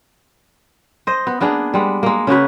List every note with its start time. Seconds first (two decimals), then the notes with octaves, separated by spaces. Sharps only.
1.07 C5 D#5
1.27 B3
1.41 A#3 B3 D4 G#4
1.74 G3 G#3 B3
2.03 G#3 A#3
2.27 C#3 A#3 F#4 B4